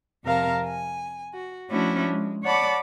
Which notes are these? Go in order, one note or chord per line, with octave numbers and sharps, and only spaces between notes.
F2 C3 A#4 F5 A5 A#5
G#5
F#4
F3 A3 C#4 D4 E4 F#4
G#3
C#5 D5 F#5 A5 B5 D6